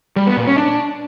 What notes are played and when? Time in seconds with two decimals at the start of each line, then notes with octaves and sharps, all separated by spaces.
0.16 G3
0.27 B3
0.37 A#2
0.47 C#4
0.57 D4